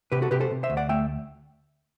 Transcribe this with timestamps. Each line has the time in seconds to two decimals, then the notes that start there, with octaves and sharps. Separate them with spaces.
0.12 C3 G4 B4
0.22 F#4 A4
0.31 C3 G4 B4
0.40 A4 C5
0.51 C3
0.63 C5 E5
0.70 D2
0.77 D5 F#5
0.89 A3 E5 G5